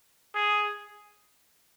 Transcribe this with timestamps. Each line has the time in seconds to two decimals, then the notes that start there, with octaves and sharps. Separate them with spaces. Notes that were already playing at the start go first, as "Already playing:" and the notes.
0.35 G#4